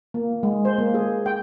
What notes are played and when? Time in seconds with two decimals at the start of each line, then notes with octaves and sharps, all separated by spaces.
0.14 A#3
0.43 G#3
0.65 C5
0.78 A#3
0.94 G#4
1.26 G5